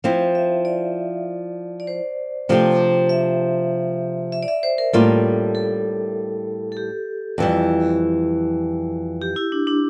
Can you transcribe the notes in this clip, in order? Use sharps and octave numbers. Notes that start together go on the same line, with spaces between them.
F3 C4 E4 F5
E5
D5
D5
C5
C3 F3 A3 D4 G4
E5
E5
D5
E5
C5
A#4
A2 G3 A#3 D4 F4 A4
A4
A4
G4
F2 E3 G3
G4
E4
D4
D4